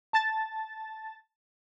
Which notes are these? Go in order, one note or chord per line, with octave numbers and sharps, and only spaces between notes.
A5 A6